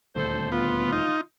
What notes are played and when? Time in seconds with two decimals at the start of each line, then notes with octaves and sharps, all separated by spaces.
0.16 D#1 D2 A4 C5
0.52 B3 F4
0.92 D#4